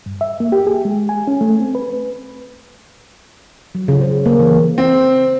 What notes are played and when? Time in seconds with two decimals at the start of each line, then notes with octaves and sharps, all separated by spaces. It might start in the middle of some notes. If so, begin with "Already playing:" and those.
0.06 G2
0.21 E5
0.40 A#3
0.52 G4
0.67 G#4
0.85 G#3
1.09 G#5
1.27 C#4
1.41 A3
1.60 C4
1.75 B4
3.75 F#3
3.88 C#3
4.01 C5
4.26 A#3
4.40 E3
4.78 C4